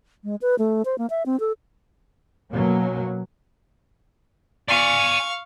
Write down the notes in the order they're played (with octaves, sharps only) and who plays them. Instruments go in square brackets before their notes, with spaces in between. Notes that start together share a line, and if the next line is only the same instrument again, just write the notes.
[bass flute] G#3
B4
A3
C5
A#3
E5
C4
A4
[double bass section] B2 F#3 A#3 C#4
[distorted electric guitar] D5 G#5 [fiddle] F5 C#6